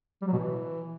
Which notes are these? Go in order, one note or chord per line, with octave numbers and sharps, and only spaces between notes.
G3
F#3
B2
E3